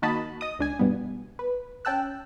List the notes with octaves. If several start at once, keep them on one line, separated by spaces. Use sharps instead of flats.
D#3 A#3 F#4 D#5 A5 B5
D#5 D#6
C#2 D4 G#5
G2 B2 G3 B3
B4
C#4 G5 A5 E6 F#6